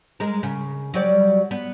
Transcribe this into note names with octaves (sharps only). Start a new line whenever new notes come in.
G#3 A#4
C#3
F#3 G3 D5
B3